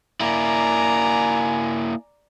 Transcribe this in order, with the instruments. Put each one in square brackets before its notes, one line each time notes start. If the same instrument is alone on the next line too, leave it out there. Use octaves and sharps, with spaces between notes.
[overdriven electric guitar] A#3 E4 [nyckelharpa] D5 A#5 [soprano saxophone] G#5